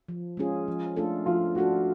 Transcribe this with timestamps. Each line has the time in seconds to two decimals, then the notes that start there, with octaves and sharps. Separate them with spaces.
0.09 F3
0.37 G#3 C#4 F4 G#4
0.68 F3
0.96 A3 D4 F4 A4
1.26 F3 F4
1.55 A3 D4 F4 F#4 A4